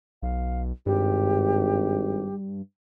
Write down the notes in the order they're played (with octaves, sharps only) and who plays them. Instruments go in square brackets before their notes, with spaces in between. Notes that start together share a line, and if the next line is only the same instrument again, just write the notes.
[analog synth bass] B1 [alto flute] F5
[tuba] G#1 [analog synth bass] G2 [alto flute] G4